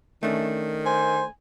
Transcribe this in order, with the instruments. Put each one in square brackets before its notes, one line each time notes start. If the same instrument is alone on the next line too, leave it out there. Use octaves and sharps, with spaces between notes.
[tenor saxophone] D#3 [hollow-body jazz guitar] A3 C#4 D4
[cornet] C5 [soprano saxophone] G#5